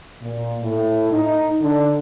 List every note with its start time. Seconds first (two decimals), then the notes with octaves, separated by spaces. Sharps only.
0.22 A#2
0.62 A2
1.12 D#4
1.61 D3